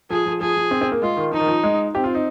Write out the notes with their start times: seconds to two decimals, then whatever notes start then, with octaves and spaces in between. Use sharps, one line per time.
0.10 F3 G#4
0.26 F3
0.41 F3 G#4
0.57 F3
0.71 C4
0.81 C4
0.92 A#3
1.02 G#3 F4
1.17 D#3
1.32 F3 D#4
1.40 D#3
1.47 F3
1.63 G#3
1.94 C4 G4
2.04 F4
2.15 D#4